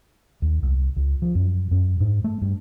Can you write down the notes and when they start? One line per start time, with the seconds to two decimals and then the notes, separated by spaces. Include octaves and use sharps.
0.42 D#2
0.63 C2
0.97 C#2
1.22 F3
1.35 F#2
1.71 F#2
2.00 G#2
2.24 A3
2.42 G2